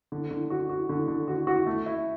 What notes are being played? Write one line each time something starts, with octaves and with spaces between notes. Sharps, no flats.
D3
D3
F#4
F#4
D3
D3
F#4
F#4
A3
E4